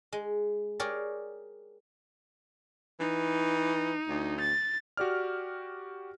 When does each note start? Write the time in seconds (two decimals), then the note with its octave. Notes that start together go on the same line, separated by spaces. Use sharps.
0.13 G#3
0.80 G4 G#4 A#4 C#5 D5
3.00 E3 D#4
4.08 D2
4.40 A6
4.97 F#4 G4 D5 F6